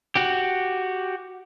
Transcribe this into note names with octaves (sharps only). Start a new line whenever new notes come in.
F#4 G4